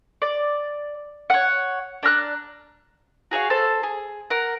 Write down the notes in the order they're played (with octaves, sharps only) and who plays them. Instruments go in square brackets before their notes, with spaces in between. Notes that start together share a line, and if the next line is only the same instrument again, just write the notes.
[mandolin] D5
C#5 F#5
D4 A#5 F6 F#6
F#4 G#4 C#5 F5
A4 C5
G#4
A#4 F#5